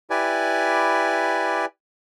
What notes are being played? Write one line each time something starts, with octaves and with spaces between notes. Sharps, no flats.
E4 G4 B4 D5 G#5